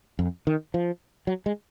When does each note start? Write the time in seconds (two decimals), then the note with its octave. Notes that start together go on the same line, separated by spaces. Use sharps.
0.19 F2
0.47 D#3
0.74 F3
1.27 F#3
1.46 G#3